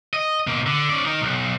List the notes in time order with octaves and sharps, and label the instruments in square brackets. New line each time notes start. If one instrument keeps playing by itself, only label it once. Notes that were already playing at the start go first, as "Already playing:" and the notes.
[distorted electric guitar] D#5
B2 A#3
D3
C#4 D5
D#4 A#4
B1